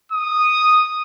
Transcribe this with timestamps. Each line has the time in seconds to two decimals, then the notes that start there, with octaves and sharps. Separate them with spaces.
0.12 D#6